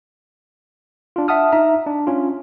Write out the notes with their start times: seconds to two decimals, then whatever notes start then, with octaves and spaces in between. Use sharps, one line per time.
1.16 D4 F4
1.28 E5 F#5 A5 D#6 F6
1.52 D#4 E5 A#5
1.86 D4
2.07 C#4 F4